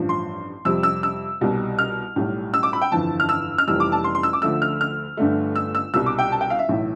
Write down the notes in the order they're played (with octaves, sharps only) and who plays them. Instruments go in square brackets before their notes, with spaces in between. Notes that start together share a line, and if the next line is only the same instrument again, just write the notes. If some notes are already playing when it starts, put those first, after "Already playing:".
Already playing: [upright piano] A1 G2 F3
C6
F2 C3 G3 E6
E6
E6
C2 B2 G3
F6
B1 A2 G3
E6
D6
B5
G5
G1 F2 E3 A5
F6
E6
F6
F1 F2 E3 G3 E6
D6
A5
C6
C6
E6
D6
D2 D3 F3 A3 E6
F6
F6
G1 G2 D3 A3
E6
E6
C2 B2 G3 E6
D6
G5
A5
G5
F5
E5
B1 A2 E3